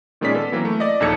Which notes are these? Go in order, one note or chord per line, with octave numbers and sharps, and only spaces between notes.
A#2 D#3 G#3 C#4 D5 B6
B3 A4
E3 F#3 A#3 C4
A3 E4
D5 D#5
A#1 D#2 D#4 A4 G#6 C#7